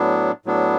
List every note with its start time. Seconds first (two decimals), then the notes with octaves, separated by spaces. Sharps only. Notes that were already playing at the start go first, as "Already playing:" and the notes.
Already playing: A2 F#3 B3 D4
0.46 A2 F#3 B3 D4